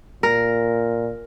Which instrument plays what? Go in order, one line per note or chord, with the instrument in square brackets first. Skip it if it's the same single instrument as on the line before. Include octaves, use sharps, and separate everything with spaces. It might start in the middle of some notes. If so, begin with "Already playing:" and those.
[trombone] A#2 [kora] A#4